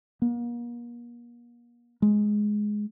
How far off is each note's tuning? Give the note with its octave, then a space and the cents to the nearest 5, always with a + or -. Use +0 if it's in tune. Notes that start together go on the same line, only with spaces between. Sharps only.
A#3 +40
G#3 +10